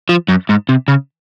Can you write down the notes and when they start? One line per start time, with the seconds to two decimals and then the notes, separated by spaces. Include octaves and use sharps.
0.09 F3
0.28 F#2
0.49 G#2
0.69 C3
0.88 C#3